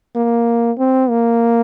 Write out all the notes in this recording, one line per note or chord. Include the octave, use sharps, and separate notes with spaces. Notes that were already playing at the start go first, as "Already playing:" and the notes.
A#3
C4
A#3